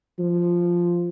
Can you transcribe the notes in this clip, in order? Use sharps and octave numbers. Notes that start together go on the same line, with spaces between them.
F3